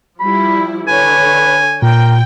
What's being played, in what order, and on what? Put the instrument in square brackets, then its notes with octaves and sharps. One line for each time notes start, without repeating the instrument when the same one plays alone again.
[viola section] F3 G3 E4 [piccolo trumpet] B5
[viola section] D3 C#5 [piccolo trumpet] B4 [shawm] G#5
[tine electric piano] A#2 [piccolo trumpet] A#4 [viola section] G5